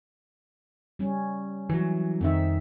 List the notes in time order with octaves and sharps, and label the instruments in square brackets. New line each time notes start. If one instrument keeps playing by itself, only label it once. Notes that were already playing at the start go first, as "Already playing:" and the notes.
[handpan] G3 C#4
[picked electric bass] E3 F#3
[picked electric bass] F2 D#3 [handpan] C4 D#4 E5